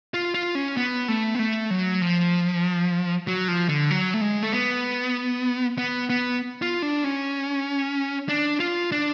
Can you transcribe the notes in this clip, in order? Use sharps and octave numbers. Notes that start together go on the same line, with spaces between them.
F4
F4
C#4
B3
A3
B3
A3
F#3
F3
F#3
F3
D3
F#3
A3
G#3
A3
B3
B3
B3
F4
D4
C#4
D4
F4
D4